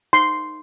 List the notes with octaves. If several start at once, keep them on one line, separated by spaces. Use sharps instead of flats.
D#4 C6